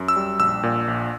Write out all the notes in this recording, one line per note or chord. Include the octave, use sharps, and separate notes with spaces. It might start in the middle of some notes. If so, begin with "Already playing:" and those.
Already playing: F#2
E6
G3
A#1 E6
A#2
A#1